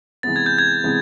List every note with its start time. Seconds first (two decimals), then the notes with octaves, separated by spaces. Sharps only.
0.23 C3 E3 G#3 B3 A6
0.36 G#6
0.46 G6
0.58 G#6
0.84 C3 E3 G#3 B3